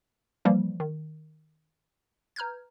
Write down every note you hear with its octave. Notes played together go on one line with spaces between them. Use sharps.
E3 F3 G3 A#3
D#3
B4 A#5 F6 G6 G#6